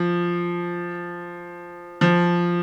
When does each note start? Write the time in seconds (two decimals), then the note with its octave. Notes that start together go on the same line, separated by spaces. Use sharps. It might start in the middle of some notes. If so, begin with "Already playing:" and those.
Already playing: F3
2.01 F3